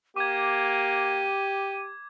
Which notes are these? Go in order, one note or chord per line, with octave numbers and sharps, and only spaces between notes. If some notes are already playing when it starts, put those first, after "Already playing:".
A#3 G4 D6 G#6 D#7